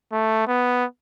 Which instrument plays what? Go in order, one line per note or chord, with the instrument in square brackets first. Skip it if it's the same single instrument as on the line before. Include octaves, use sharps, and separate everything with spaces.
[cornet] A3
B3